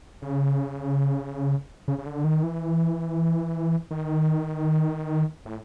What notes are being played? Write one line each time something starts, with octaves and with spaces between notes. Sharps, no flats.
C#3
C#3
C#3
D3
D#3
E3
D#3
A2